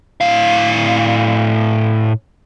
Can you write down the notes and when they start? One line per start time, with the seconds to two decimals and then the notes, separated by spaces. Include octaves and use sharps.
0.21 A2 F5